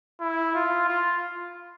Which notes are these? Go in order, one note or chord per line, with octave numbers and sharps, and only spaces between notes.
E4
F4
F4